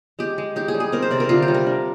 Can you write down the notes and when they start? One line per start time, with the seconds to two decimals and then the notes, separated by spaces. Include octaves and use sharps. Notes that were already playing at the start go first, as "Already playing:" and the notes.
0.19 G#3 G4
0.38 G#3
0.56 D#4 G4
0.68 G#4
0.74 G3
0.80 G#4
0.92 C4 A#4
1.02 C5
1.11 C3 D5
1.20 A#4
1.29 D3 F4
1.42 G4
1.48 G3
1.54 A#4
1.66 D4